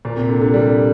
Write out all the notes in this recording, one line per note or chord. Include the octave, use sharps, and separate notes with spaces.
A#2
C3
D3
D3
G3